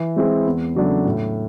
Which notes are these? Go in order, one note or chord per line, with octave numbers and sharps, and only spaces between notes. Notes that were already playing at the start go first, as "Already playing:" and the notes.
Already playing: E3
G#3 C4 E4 G#4
E2
C#3 F#3 A3 D4
A2